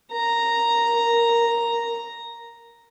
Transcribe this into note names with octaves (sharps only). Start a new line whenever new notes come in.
A#4 A#5